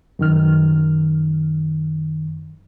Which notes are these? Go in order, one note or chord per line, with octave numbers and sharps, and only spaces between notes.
F#2 D#3 F6